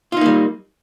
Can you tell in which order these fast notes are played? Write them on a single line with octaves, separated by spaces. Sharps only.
F4 D#4 A#3 G3